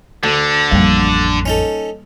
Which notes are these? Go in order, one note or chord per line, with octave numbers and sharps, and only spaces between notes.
D2 D3
A1 F2 G3 A#3
C#4 D#4 A4